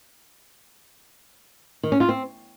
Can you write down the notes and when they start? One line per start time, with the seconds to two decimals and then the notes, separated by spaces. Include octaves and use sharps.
1.83 D#3
1.92 C#4
2.00 F4
2.09 C4